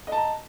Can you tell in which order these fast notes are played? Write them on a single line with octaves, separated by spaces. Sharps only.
D#5 A5 A#5